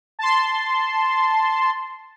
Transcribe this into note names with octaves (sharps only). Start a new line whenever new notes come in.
A5 C6